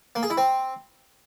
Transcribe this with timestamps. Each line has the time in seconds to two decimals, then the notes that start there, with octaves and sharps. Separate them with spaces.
0.16 A#3
0.23 G#4
0.30 E4
0.37 C4